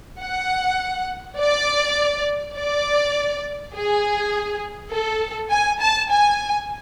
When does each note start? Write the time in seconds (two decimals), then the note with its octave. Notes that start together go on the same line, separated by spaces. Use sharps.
0.21 F#5
1.39 D5
2.57 D5
3.75 G#4
4.92 A4
5.51 G#5
5.81 A5
6.11 G#5